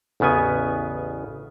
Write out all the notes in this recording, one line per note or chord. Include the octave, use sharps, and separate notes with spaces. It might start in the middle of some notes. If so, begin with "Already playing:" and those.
A1 E2 C#3 B3 G#5